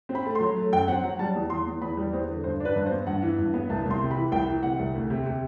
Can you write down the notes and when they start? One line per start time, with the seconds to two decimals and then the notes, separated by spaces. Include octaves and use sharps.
0.09 C4
0.15 B5
0.25 A3
0.35 C6
0.41 F#3
0.56 A3
0.72 F#2 G5
0.88 C4 F#5
1.03 F#3 F#5
1.19 G3 A5
1.35 E2
1.50 E2 C6
1.66 E2
1.81 E2 B5
1.97 G3
2.13 E2 C5
2.28 D3
2.44 G2 C5
2.60 D4 B4
2.76 G2
2.86 C5
2.91 B3
3.07 G2 F#5
3.22 E3
3.39 G2
3.54 B3
3.69 C2 A5
3.85 C2
3.91 C6
4.01 C3
4.11 B5
4.16 E3
4.32 C2 G5
4.48 E3
4.63 C3 F#5
4.79 C2
4.95 D2
5.10 C3
5.26 C3